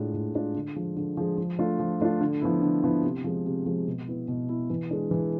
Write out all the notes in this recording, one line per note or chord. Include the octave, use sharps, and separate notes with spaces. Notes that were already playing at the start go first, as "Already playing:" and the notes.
Already playing: A2 G#3 D4 F4
A2
G#3 D4 F4
D3
F3 G#3
D3
F3 G#3
F3
A3 D4 F4
F3
A3 D4 F4
D3
F3 B3 E4
D3
F3 B3 E4
C3
F3 G#3
C3
F3 G#3
B2
B3 E4
B2
B3 E4
E3
G#3 D4
E3